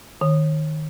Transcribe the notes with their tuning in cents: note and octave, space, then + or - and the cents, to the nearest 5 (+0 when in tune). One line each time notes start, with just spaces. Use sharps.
D#3 -10